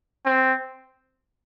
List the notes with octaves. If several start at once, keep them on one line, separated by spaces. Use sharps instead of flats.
C4